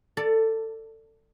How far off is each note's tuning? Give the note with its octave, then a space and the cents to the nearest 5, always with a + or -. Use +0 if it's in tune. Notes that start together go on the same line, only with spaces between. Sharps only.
A4 +20 D5 +0